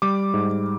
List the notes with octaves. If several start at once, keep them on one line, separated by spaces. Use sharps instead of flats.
G3 D6
G#2